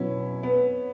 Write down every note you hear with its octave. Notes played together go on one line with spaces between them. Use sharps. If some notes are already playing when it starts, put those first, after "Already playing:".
Already playing: B2 F#3 B3 C#4 E4
B3